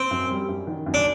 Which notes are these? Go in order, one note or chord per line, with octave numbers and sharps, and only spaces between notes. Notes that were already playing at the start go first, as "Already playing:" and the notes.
Already playing: C4
F#2
G3
F#2
D#3
F#2
D4